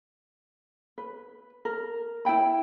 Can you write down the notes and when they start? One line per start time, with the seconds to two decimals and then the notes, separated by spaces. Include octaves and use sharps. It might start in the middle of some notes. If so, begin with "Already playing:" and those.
0.98 B4
1.65 A#4
2.25 E4 E5 G5 B5